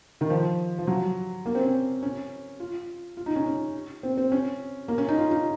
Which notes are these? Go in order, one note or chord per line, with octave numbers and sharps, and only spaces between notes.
D#3
F3
F3
F#3
A#3
C4
C#4
C#4
F4
F4
D#4
C#4
C#4
C4
C4
C#4
A#3
C#4
D#4
F4
D#4